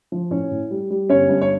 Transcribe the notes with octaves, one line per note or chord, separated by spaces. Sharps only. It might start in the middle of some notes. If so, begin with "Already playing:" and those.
F3
A2 C#4 C#5
A2
G3
G3
G1 C#4 C#5
G2
C#5